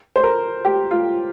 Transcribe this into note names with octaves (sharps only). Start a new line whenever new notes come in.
C5
A#4
G4
F4